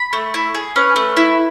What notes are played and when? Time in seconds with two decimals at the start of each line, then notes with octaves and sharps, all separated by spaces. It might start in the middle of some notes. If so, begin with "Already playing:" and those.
Already playing: B5
0.13 A3
0.34 E4
0.55 G#4
0.76 C#4 B4
0.96 A3
1.17 E4